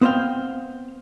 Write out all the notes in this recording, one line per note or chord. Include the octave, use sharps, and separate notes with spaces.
B3 C4 C5 D#5 F5 G5